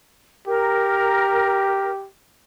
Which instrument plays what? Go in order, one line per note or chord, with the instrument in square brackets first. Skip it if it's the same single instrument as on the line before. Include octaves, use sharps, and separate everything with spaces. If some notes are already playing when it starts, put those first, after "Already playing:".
[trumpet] G4 [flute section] A#4